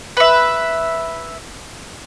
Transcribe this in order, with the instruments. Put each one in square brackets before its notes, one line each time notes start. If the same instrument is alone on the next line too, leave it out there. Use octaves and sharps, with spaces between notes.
[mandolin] B4 E5